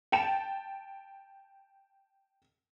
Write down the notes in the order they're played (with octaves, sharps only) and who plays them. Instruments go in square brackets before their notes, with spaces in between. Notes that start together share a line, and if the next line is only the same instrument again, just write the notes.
[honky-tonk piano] G5 A5 E7